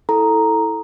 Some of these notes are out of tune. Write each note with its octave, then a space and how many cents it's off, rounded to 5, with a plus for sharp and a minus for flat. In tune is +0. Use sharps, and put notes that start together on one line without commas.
E4 -10 A4 +0 A#5 +0